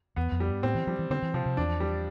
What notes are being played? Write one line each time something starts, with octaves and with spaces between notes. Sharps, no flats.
E2 B3
F2
G3
G2
A2 C4
E3
F3 G3
E3
D3 C4
E3
C3 F3
C3
E2 D4
G3